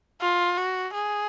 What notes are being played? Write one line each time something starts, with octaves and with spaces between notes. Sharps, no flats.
F4
F#4
G#4